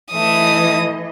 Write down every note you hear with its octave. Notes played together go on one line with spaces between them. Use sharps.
E3 A3 D#5 D#6